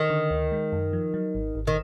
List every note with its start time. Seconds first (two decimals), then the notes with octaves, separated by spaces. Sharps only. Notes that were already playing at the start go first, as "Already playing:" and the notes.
Already playing: D#3
0.10 D3
0.30 D2
0.52 G#3
0.72 F#2
0.93 F3
1.14 F#3
1.35 G#1
1.55 G#1
1.67 D#3